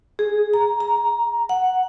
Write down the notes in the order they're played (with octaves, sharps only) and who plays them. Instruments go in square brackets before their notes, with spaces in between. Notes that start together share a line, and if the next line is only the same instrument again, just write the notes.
[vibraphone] G#4
A#5
A#5
F#5